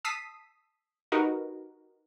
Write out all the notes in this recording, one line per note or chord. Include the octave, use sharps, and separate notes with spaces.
A5 D#6 E6 B6 C7 D#7
D#4 F#4 G4 A#4 B4